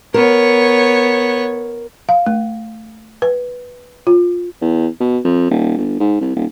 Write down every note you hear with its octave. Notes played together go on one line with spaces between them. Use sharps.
B3 A#4 C#5
F5
A3
B4
F4
E2
B2
F2
D#1
G1
G#2
C2
D#1